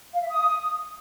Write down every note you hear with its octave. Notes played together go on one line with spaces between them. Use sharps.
F5
E5
D#6